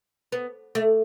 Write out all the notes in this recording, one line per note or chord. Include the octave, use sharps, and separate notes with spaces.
B3
A3